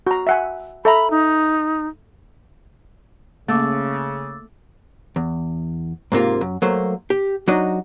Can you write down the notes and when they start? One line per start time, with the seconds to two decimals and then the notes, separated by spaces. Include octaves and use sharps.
0.07 F#4 A#5
0.27 E5 F#5 G#5
0.85 A4 E5 A#5 B5
1.11 D#4
3.48 C#3 A3 A#3 D6 E6 A6
5.16 E2
6.12 G#2 C3 A#3 F4
6.41 F#2
6.62 F#3 A3 A#3 C5
7.10 G4
7.48 F#3 D4 D#4 F#4 D#5